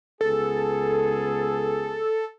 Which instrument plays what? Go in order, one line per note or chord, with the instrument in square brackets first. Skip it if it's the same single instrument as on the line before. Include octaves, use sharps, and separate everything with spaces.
[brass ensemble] C#2 B3 G#4 [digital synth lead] A4